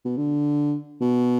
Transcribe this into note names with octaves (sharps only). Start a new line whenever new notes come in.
B2
D3
B2